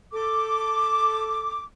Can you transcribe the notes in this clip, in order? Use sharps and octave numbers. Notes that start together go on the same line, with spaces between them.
A4 D6